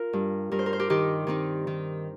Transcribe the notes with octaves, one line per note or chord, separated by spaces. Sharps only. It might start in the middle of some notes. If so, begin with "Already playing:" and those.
Already playing: F4 A#4
G2
G2 A#4
C5
A#4
C5
G4 A#4
D#3 D#4 G4
D#3 C4 D#4
D#3